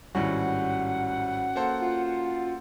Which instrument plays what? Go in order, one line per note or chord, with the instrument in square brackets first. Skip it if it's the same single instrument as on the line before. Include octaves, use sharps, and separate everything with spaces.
[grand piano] G#1 A2 G3 [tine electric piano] C#4 F#4 [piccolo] F#5
[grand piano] A#3 A4 C5
[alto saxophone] F4